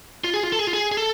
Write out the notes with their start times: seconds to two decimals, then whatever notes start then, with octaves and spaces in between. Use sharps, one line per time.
0.24 F4
0.34 G#4
0.43 F4
0.52 A4
0.59 G#4
0.67 F4
0.73 G#4
0.92 G#4
0.97 A4